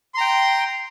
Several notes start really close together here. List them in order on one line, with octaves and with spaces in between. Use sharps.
C6 A#5 G5